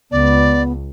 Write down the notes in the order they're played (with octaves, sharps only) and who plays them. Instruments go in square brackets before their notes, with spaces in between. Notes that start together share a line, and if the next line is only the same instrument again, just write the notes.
[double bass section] C#2 [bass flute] B3 [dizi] D5